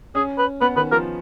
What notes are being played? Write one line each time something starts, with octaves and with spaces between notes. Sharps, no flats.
C#4 G#4
B4
B3 B4
D#3 B4
F3 A#4